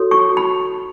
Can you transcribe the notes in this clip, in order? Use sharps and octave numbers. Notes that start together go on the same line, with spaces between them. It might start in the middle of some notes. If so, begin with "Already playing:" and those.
Already playing: F#4 A4 C#5
C#6
B5